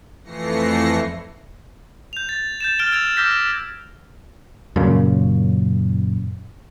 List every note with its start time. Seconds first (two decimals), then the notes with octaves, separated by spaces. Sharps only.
0.24 F2 E3 A3 A#6 C7 C#7
2.13 G6 F7
2.29 A6
2.60 G6 A6 E7
2.79 F6 A6 D7 G7
2.92 E6 G#6 A6 D7 F7
3.17 D6 E6 F6 G6 A#6 B6
4.76 F#2 A#2 C#3